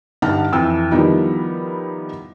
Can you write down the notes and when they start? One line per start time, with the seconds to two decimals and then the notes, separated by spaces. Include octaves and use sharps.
0.22 G2 D3 D#4 F#5 A5 F6
0.53 F2 E3 E6
0.91 D#3 F3 G3 B3 D#4 E4